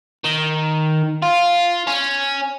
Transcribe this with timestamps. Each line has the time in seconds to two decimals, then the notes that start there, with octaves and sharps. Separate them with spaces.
0.25 D#3
1.22 F4
1.87 C#4